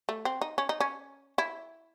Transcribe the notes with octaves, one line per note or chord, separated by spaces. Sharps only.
A3
C4
D#4
C#4
D#4
C#4
E4